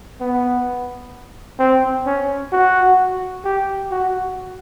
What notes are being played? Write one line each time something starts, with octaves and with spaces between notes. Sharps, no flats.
B3
C4
C#4
F#4
G4
F#4